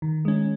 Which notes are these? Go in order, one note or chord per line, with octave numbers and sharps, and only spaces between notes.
D#3
G#3 C#4